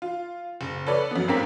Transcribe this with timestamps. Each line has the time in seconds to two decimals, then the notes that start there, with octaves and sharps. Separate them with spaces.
0.02 F4
0.61 F#1
0.86 A4 B4 C#5 D5
1.11 F#2 B3
1.28 A1 G#2 A#3 C4 A#5 B6